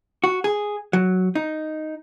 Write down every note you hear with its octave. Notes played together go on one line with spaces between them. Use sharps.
F#4
G#4
F#3
D#4